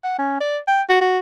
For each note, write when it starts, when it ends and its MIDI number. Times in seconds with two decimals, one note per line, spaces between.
0.04 0.15 78
0.19 0.39 61
0.40 0.58 74
0.67 0.82 79
0.89 0.97 66
1.01 1.19 66